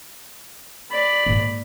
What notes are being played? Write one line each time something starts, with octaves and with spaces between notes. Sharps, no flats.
D5 B5
G#2 A#3